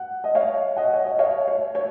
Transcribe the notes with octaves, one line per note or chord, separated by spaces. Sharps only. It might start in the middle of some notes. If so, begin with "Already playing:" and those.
Already playing: F#5
D#5
C#5 F5
D#5 F#5
C#5
D#5
C#5 F5
C#5
C#5